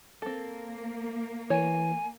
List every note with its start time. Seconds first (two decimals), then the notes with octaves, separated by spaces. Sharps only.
0.22 A#3 C4 A4
1.50 E3 C#5 G#5